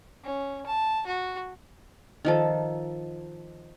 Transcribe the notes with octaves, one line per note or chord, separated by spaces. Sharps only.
C#4
A5
F#4
D#3 F3 A4